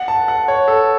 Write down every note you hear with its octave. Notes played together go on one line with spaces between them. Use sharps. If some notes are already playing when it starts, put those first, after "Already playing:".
Already playing: F#5
A5
F#5
C#5
A4